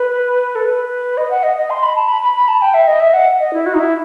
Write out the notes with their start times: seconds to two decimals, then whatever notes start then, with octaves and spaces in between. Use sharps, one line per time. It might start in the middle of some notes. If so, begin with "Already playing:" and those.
Already playing: B4
0.55 A4
0.65 B4
1.17 D#5
1.31 F#5
1.43 D#5
1.57 D#5
1.70 C6
1.83 B5
1.96 A5
2.08 B5
2.22 B5
2.35 B5
2.48 A5
2.62 G5
2.74 E5
2.87 D#5
3.00 E5
3.13 F#5
3.39 D#5
3.53 E4
3.66 F#4
3.74 D#4
3.79 E4